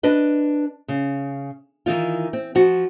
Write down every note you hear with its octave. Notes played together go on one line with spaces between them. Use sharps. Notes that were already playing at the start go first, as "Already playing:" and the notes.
D4 B4 D#5
C#3
D#3 E3 D#4 F4
C4
F3 F#4